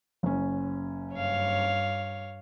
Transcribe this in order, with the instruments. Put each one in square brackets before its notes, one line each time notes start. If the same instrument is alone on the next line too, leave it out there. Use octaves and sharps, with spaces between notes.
[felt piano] F#1 C#4
[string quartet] G2 C#5 F5